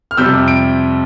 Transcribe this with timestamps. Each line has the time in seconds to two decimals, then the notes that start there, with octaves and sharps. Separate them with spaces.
0.11 F6
0.17 F2 C3 G3 E6 G6
0.48 D7